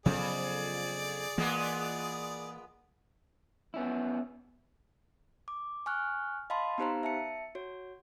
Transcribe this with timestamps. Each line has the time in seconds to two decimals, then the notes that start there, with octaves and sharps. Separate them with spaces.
0.06 F2 C#3 F#3 B3 G#4 D5
1.38 A#2 E3 G#3 A#3 B3
3.74 B3 C#4 E4
5.48 D6
5.86 G#5 C#6 F6 F#6
6.50 D#5 F5 A5 B5 C6
6.78 B3 D#4 G4 C5 F5 A#5
7.03 E5 A5 C#7
7.55 F#4 C#5